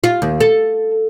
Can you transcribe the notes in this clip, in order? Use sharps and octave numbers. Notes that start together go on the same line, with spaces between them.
F4
D#2
A4